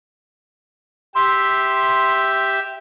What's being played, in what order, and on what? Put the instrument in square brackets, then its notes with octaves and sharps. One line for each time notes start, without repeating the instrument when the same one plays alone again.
[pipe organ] G4 E5 [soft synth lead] C6